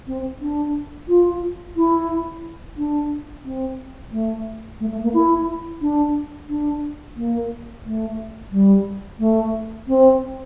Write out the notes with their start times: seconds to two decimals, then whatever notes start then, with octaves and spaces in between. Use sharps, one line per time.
0.07 C4
0.41 D4
1.08 F4
1.76 E4
2.77 D4
3.45 C4
4.12 A3
4.80 A3
4.91 A3
5.03 A#3
5.14 E4
5.81 D4
6.49 D4
7.16 A#3
7.85 A3
8.52 G3
9.19 A3
9.88 C4